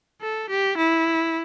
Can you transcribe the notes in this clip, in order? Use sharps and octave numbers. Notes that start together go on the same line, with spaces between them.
A4
G4
E4